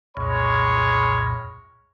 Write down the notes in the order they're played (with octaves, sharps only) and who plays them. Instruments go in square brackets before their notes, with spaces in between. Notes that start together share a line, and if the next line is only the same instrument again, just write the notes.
[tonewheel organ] C2 F2 A#2 [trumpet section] G#3 C#5 B5